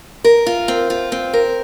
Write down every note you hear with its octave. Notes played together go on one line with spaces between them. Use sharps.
A#4
F4
C4
F4
C4
A#4